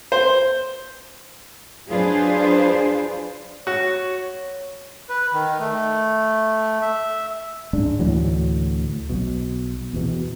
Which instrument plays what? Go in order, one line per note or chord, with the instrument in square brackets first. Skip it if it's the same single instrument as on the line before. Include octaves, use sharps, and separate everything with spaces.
[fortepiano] C5
[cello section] F#3 D4 F4 G#4 B4 C5
[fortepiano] F#4 [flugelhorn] C#5
[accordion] B4
D#3
A3
E5
[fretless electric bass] D1 G#2 D4
D2 A2 E3 F#3
B1 B2
E2 B2